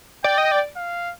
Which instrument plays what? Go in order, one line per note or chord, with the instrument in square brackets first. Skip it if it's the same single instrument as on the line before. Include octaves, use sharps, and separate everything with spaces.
[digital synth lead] D5 [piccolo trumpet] G5
[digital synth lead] D#5
D5
[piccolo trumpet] F5